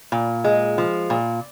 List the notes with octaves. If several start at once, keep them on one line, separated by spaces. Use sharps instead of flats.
A#2
G#3
F3
A#2